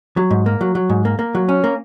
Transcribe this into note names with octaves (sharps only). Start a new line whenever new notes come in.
F#3
G#2
A#3
F#3
F#3
G#2
A#3
A#3
F#3
C#4
A#3